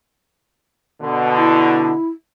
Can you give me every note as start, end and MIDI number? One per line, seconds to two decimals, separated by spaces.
1.01 1.92 47
1.01 1.92 50
1.37 2.07 64